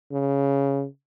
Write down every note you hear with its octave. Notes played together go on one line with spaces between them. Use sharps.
C#3